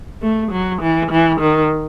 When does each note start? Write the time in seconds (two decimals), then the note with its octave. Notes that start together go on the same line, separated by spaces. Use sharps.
0.22 A3
0.51 F#3
0.82 E3
1.11 E3
1.40 D#3